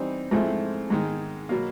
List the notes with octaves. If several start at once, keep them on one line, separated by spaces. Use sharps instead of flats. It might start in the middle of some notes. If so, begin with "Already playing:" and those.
Already playing: E3 G3 C4 D#4
G#2 F3 A3 C4 E4
G#2 D#3 G#3
B2 F#3 A#3